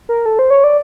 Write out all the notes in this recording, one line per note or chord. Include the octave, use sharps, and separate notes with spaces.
A#4
A4
C5
C#5
D5